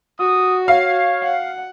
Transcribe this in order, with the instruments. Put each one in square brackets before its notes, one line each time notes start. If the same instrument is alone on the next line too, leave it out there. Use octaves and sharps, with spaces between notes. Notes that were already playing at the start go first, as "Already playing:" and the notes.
[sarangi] F#4 [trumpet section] D#6
[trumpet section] C#5 [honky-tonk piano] F5
[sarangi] F#5